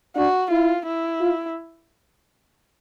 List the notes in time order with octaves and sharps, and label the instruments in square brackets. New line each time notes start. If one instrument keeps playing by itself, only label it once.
[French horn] D4 [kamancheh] F#4
[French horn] E4 [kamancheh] F4
[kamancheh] E4
[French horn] F4